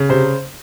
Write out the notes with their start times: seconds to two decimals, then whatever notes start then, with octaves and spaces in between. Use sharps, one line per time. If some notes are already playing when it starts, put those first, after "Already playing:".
Already playing: C#3
0.09 C3 C5